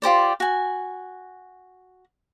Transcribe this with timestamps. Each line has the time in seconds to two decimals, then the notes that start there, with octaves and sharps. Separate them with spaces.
0.02 F4 G4 C5 D5
0.40 F#4 G#5